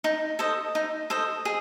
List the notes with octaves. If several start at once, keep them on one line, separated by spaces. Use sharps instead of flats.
D#4
A4 C5 D#5
D#4
A4 C5 D#5
G#4